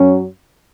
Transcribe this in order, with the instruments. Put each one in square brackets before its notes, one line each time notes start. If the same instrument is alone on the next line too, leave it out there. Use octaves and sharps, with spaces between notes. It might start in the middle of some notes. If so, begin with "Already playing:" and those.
Already playing: [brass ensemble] F#2 F#3 C#4